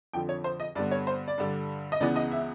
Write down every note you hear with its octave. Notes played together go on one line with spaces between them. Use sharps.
F2 D3 F3 G5
C#5
C5
D#5
G2 D3 G3 B3 D5
C#5
C5
D5
G2 D3 G3
D#5
C#2 C#3 E3 G#3 B3 D5
D#5
E5